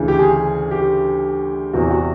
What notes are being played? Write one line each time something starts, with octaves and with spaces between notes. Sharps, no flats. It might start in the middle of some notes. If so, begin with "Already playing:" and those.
Already playing: D2 C#3 E3
G4
G#4
G4
E2 C3 E3 F#4
F#4